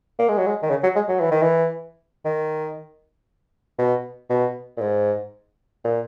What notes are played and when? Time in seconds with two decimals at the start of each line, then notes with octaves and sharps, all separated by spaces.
0.19 A#3
0.28 G#3
0.38 F#3
0.46 G#3
0.62 D#3
0.70 C#3
0.83 F#3
0.95 G#3
1.08 F#3
1.20 E3
1.31 D#3
1.42 E3
2.25 D#3
3.78 B2
4.30 B2
4.77 A#2
4.81 G#2
5.84 A#2